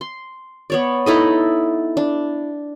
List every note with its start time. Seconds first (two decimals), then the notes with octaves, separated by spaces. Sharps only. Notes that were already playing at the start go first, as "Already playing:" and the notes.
0.01 C6
0.70 B3 C#5 D5
1.06 D#4 E4 A4 D#5
1.97 D4